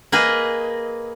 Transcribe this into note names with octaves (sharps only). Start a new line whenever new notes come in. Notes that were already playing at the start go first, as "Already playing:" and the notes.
A#3 G#4 B4 D#5